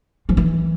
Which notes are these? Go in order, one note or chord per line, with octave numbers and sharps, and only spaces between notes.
F3
E3